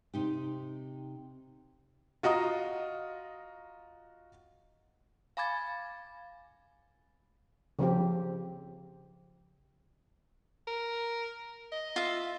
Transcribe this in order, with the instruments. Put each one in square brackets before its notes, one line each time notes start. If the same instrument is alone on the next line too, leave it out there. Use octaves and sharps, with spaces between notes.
[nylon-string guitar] C3 D#4 G4
[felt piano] F4 F#4 D#5 A#5 D#6
[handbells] F5 G#5 B5 D6 G#6 A6
[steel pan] C#3 F3 C4 G4
[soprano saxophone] A#4
D#5
[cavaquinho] F4 E5